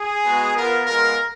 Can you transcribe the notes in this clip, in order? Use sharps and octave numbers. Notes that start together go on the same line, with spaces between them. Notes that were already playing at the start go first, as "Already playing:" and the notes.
Already playing: G#4
G#3 B3 F#4
B3 F4 A#4
G#3 B3 F4 A#4